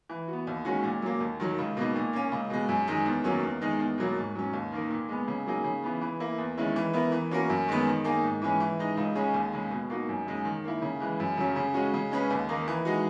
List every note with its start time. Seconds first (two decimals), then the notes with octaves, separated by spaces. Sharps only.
0.09 E3
0.28 B3 F#4
0.47 D#2
0.65 D#3 G#3 C#4 F#4
0.83 A#2
1.02 F#3 A#3
1.20 D#2
1.40 D#3 F#3
1.58 C#2
1.77 B2 A#3 D#4
1.95 A#2
2.13 A#3 C#4
2.32 C#2
2.50 B2 G#3
2.69 F#2
2.87 D#3 G#3 D#4 G#4
3.06 E2
3.24 D#3 F#3 A#3 C#4
3.43 E2
3.61 D#3 G#3 D#4
3.80 E2
3.98 B2 F#3 A#3
4.17 G#2
4.35 F#3 C#4
4.53 D#2
4.72 D#3 A#3 D#4 A#4
4.90 A#2
5.09 G#3 B3
5.28 C#3
5.47 F#3 A#3 D#4 G#4
5.64 C#3
5.84 E3 B3
6.01 E3
6.20 A#3 E4
6.38 E2
6.58 D#3 G#3 C#4 E4
6.76 E3
6.93 B3 E4 A#4
7.12 E3
7.31 A#3 C#4 F#4 A#4
7.50 F#2
7.68 D#3 G#3 B3
7.86 D#3
8.04 A#3 D#4 G#4
8.23 G#2
8.42 E3 G#3 C#4 G#4
8.60 E3
8.79 G#3 D#4
8.97 C#2
9.15 C#3 G#3 C#4 G#4
9.34 D#2
9.53 C#3 G#3
9.71 B2
9.90 A#3 D#4 F#4
10.09 F#2
10.27 C#3 G#3 D#4
10.45 D#3
10.64 A#3 E4
10.82 C#3
11.00 E3 G#3
11.20 F#2
11.37 C#3 F#3 C#4
11.56 C#3
11.74 G#3 C#4 F#4
11.94 C#3
12.11 G#3 C#4 G#4 B4
12.30 D#2
12.49 D#3 A#3 D#4
12.68 E3
12.85 G#3 D#4 F#4